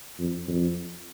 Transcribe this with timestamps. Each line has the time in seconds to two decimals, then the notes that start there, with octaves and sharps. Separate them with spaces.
0.19 F2
0.48 F2